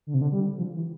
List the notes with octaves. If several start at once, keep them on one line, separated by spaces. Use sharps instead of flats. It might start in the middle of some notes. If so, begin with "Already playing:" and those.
D3
C3
D3
G3
F3
E3